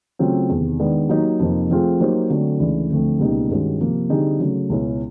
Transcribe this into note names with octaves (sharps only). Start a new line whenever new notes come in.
C#3 F#3 A3 C4 F4
E2 C3 D#3
D#3 G#3 B3 D4
F#3 A#3 D#4 G4
F2 C3 F3 A#3 D#4
F3 A3 C4 F4 G#4
F#3 A#3 D#4 G4 C5
D3 F#3 A3 C4
C#2 C#3 E3 A3 D4
D2 D3 F3 A3 C4
C#2 B2 G3 A#3 D#4
G2 D#3 G#3 C#4 F#4
C3 F3 A#3
D3 G3 C4 D#4 G#4
C#3 F#3 A3
C#2 B2 G#3 C#4 E4